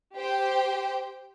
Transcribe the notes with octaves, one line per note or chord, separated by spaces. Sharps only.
G4 C5 G5